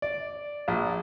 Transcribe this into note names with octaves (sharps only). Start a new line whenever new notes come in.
D5
A#1